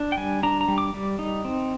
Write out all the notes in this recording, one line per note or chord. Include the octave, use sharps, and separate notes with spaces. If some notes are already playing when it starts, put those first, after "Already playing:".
Already playing: D4
G5
G3 G#5
D4 A#5
A#5
G3
D6
G3
D#4
C4